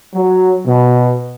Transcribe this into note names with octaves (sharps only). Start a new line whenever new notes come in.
F#3
B2